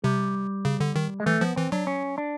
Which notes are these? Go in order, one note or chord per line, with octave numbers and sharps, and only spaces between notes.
C3 G3
C#3
D3
D#3
G#3
E3 A3
F3 B3
E3 C4
F#3 D4
C#4
D4